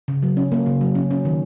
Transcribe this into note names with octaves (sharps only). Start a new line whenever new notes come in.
C#3
F#3
C#4
A#3
C#3
F#3
C#4
C#4
D#3